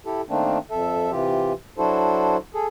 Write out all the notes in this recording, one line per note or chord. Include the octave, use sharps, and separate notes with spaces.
E4 G4 A4
D#3 A3 A#3 C4 D4
F2 A4 E5
C3 E3 F4 G4
F#3 D4 E4 F#4 A4 C5
G#4 A4